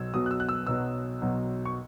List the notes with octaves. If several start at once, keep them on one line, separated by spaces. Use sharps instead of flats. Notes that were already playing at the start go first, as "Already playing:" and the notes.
Already playing: B1 B2 F#3 E6 G#6
B1 B2 F#3 D#6
F#6
E6
F#6
E6
B1 B2 F#3 E6
B1 B2 F#3
C#6